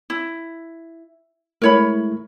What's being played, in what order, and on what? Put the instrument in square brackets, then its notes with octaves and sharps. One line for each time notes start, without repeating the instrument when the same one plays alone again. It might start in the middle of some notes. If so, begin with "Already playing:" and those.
[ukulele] E4
[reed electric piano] G#3 A3 E4 [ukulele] A#4 C#5 B5